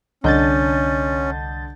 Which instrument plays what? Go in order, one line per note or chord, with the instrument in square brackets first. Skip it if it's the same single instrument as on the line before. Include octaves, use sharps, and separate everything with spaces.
[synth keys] C2 G6 A6 [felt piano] D3 D4 D#5 [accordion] C#4